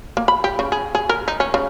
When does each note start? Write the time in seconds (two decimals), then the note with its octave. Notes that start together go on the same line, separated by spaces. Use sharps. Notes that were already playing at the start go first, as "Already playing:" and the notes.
0.17 A#3
0.28 B5
0.44 G4
0.59 C#3
0.72 G#4
0.95 G#4
1.09 A#4
1.28 D#4
1.40 C#4
1.54 C#3